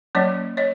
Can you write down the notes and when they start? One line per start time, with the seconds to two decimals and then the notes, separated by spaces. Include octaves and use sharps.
0.15 F#3 A#3 C#4 C#5 D#5
0.57 C#5 D#5